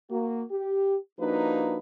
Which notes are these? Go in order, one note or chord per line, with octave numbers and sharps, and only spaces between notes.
A#3 F#4
G4
F3 A#3 D4 D#4 F#4 B4